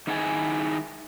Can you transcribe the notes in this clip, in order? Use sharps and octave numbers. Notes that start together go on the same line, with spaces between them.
D#3 D#4 E4 G#4 F#5 G#5